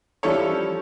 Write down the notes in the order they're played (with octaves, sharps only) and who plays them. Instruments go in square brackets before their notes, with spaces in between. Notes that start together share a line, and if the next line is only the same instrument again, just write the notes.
[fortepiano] F3 G3 C#4 E4 A4 C#5